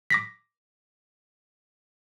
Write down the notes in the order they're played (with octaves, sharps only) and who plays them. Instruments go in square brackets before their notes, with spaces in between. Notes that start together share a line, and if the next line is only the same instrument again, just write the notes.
[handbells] D6 A#6 B6